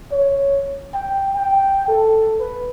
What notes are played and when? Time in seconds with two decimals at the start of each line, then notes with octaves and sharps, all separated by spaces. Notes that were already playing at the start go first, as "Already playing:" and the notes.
0.12 C#5
0.94 G5
1.36 G5
1.88 A4
2.40 B4